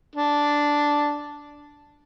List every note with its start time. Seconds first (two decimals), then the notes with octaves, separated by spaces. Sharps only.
0.16 D4